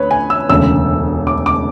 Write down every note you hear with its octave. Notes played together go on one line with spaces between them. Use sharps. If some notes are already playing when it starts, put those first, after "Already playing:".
Already playing: D2 B4 C#5
G#5
E6
E1 D2 C#3 E6
D6
D6